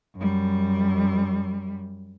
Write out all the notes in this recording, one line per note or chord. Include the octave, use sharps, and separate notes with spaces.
F#2 G3